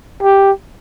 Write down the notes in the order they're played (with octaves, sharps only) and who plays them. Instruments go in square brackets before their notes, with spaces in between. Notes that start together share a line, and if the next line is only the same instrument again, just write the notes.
[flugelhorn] G4